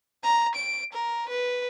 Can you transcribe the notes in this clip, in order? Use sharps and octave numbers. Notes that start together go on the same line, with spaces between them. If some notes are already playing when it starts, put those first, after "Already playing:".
A#5
D7
A#4
B4